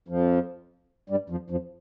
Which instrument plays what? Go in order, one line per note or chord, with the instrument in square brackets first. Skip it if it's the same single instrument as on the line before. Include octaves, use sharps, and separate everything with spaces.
[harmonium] F2 F3
G2 G3
F2 F3
F2 F3